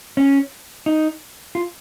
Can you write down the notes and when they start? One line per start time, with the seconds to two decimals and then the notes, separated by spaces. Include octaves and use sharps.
0.17 C#4
0.86 D#4
1.55 F4